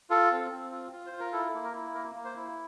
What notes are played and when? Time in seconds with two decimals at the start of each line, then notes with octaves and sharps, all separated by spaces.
0.10 F4 A4
0.32 C4
0.52 C4
0.71 F4
0.92 F4
1.07 C5
1.12 F4
1.20 A#4
1.33 E4 A4
1.54 A#3
1.64 A#4
1.74 E4
1.94 A#3 A#4
2.15 A#3
2.25 C5
2.36 E4